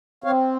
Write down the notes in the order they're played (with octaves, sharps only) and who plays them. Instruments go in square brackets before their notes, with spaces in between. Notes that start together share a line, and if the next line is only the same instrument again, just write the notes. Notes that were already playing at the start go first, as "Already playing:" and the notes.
[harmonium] C4 C#5 F5